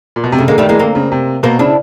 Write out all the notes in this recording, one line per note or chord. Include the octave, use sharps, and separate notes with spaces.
A#2
B2
C3
C#3 A3
D3 G#3 A#3
D#3 G3 A3
E3 G#3 A#3
D3 A#3 C4
C#3
C3
B2 A#3 C4
C#3 D4 E4